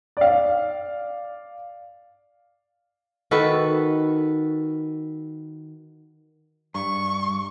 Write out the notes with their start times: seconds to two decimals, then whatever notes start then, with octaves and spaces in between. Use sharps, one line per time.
0.17 D5 F5
3.31 D#3 F#4 A4 B4
6.75 G2 C#6